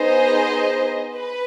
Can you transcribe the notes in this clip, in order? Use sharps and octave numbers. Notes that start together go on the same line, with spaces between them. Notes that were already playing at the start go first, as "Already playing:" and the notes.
Already playing: B3 D#4 G#4 C5 D#5
B4